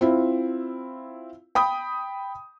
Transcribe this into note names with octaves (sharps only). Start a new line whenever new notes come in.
C4 E4 F4
G5 B5 D#6